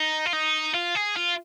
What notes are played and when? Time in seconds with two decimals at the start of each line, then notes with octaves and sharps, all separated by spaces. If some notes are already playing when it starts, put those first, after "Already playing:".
Already playing: D#4
0.26 F4
0.33 D#4
0.74 F4
0.96 G#4
1.17 F4